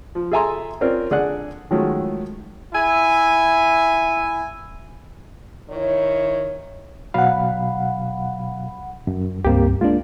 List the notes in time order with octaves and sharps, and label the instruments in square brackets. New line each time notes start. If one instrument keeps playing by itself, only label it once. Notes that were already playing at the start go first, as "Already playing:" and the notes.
[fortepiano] F3
G#4 A4 E5 G#5 A#5 C6
C4 C#4 F4 A#4 D5
D3 G#4 D5 F#5 F#6
D#3 F3 F#3 G#3 A3 C#4
[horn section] E4 E5 G#5
[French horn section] D#3 E4 C#5
[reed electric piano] B2 F#3 F5 [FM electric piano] F#5 B5
[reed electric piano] F#2
[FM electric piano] C#2 G2 C4 [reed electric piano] A#3 G4
[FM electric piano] G#3 A#3 D4 [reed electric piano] F4